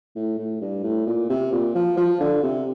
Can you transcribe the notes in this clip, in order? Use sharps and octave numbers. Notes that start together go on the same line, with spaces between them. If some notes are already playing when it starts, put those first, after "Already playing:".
A2
A2
G2
A2
A#2
C3
A#2
F3
F3
D3
C3